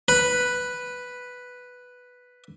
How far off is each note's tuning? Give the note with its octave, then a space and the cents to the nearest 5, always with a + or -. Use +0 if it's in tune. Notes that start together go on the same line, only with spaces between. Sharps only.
B4 +0 B5 +0